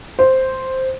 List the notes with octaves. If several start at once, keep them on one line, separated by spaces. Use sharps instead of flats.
C5